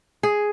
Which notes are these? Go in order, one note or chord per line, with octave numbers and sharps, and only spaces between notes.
G#4